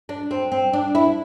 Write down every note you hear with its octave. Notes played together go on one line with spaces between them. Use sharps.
D4
C4
C4
D4
E4